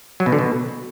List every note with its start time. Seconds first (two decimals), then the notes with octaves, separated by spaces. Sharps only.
0.20 F#3
0.26 B2
0.32 D3
0.39 B2